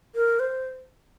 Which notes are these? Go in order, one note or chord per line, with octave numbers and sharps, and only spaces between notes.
A#4
C5